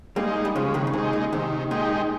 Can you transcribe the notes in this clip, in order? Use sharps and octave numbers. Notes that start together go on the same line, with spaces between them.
G3 G#3 A#3 D#4
G3
C#3 F3 G#3
C3 D#3
C#3
C3 G#3 D#4
A#2
C3 D#3
A#2 G#3 D#4 G4